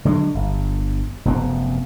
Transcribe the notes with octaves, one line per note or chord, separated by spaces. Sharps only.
D3 F#3 G#3
G1
F1 F#2 B3 C4